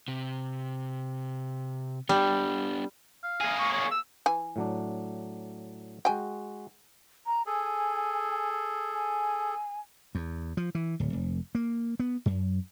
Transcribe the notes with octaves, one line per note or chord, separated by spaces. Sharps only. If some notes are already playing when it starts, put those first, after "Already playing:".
C3
G3 B3 D4
F5
A#3 G#4
C#6
C#5
E6
E3 G#5
A2 F#3 D4
G#3 F#4 G5 G#5
A#5
G#4 A4 G#5
G#5
E2
F3
E3
D1
F1
A#3
B3
F#2